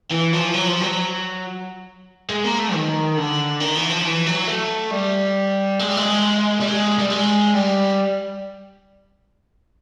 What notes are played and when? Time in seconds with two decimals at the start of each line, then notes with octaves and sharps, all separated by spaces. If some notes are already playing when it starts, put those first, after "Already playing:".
0.11 E3
0.33 F3
0.54 F#3
0.68 F3
0.82 F#3
2.30 G#3
2.44 A#3
2.59 A3
2.74 D#3
3.17 D3
3.60 D#3
3.75 E3
3.90 F3
4.05 E3
4.27 F#3
4.48 A3
4.92 G3
5.79 G#3
5.88 G3
5.97 G#3
6.60 G3
6.67 G#3
6.99 G3
7.10 G#3
7.54 G3